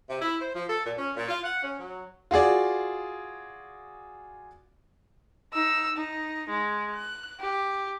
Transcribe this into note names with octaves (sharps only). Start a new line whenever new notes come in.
C3
E4
C5
F3
A4
A#2
C#4
A#2
F4
F#5
C#4
F#3
F4 F#4 G#4 D5
D#4 E6
D#4
G#3
F#6
G4